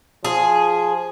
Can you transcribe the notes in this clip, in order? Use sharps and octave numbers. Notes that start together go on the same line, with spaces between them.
F3 G#4